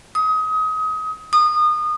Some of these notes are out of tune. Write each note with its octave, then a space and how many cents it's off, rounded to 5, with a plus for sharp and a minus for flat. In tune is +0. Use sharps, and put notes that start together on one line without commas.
D#6 +25
D#6 -30